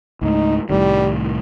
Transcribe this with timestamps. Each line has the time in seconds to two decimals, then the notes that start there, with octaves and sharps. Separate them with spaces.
0.22 C#2 G#2 A3 D#4
0.70 C2 A2 D#3 G3